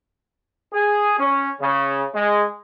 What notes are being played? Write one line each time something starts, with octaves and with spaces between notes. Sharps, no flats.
G#4
C#4
C#3
G#3